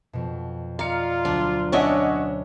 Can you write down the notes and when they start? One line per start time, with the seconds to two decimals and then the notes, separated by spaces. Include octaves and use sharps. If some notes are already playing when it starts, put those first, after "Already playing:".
0.13 F2 B2
0.79 F4 D5 D#5 F5 A#5 D6 C#7
1.25 D2 F#3 D4
1.72 C#4 D4 C#5 D#5 E5 F#5